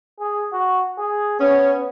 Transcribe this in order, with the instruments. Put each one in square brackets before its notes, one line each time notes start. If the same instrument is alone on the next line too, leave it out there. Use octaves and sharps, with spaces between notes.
[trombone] G#4
F#4
G#4
[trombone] B3 [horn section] C#4